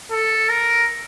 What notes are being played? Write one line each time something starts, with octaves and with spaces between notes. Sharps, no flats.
A4
A#4